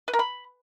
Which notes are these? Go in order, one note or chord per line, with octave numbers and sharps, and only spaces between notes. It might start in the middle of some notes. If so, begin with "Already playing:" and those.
B4
A#4
B5